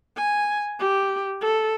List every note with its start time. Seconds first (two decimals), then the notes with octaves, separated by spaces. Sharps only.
0.17 G#5
0.80 G4
1.41 A4